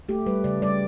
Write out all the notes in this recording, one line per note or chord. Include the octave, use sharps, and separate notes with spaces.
A3 G4
G3 B4
C#3 D5
G3 D5